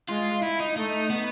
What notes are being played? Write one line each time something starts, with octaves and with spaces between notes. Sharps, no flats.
G#3 F4
E4
D#4
A3 D#4
B3